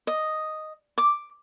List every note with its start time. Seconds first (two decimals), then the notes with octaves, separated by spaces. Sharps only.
0.07 D#5
0.98 D6